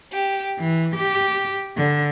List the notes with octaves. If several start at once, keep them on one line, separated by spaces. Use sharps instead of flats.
G4
E3
G4
D3